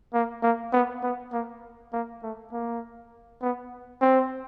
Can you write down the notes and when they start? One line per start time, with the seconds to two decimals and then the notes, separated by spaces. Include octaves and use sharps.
0.14 A#3
0.43 A#3
0.73 B3
1.03 B3
1.33 A#3
1.93 A#3
2.23 A3
2.52 A#3
3.42 B3
4.02 C4